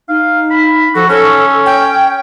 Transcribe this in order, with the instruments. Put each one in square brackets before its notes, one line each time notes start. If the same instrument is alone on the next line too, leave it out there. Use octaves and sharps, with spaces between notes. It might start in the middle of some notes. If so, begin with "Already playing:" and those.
[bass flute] D#4 [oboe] F5
[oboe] B5
[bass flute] F3 [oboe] F#4 [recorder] A4
[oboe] C#4 [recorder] A4 [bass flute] C#5
[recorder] G5